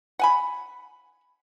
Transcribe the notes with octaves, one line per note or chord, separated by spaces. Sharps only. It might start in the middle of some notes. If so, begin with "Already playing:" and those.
F#5 G#5 B5